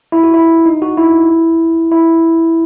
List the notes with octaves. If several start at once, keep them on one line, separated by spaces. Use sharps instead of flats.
E4
F#4
E4
D#4
F#4
E4
E4